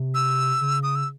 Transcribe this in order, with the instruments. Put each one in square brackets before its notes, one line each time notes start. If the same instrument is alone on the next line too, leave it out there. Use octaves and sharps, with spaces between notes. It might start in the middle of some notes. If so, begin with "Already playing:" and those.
Already playing: [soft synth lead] C3
[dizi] E6
[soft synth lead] C#3
[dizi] D#6
E6